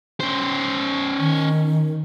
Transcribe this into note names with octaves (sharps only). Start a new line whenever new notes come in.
C#4 C5
D#3